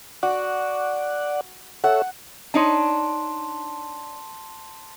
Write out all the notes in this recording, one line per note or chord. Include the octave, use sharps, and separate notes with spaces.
F#4 D5 F#5
A4 C#5 E5 F#5
D4 D#4 C#5 A5 C6